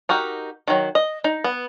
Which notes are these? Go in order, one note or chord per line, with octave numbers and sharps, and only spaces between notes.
D#4 F#4 G4 A#4
D#3 F#3
D#5
D#4
B3